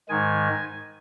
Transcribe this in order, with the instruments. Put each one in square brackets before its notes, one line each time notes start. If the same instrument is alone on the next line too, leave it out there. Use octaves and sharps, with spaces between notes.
[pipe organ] G#2 D#3 G#3 G#5